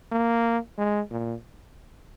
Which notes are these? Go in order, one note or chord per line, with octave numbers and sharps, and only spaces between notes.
A#3
G#3
A#2